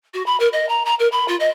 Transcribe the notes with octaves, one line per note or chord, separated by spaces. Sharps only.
F#4
B5
A#4
D#5
A#5
A#5
A#4
B5
F4
D#5